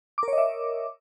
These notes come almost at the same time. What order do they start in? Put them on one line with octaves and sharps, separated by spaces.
D6 A#4 C#5 D#5 E5